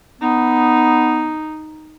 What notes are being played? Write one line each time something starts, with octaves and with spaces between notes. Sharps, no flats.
B3 D#4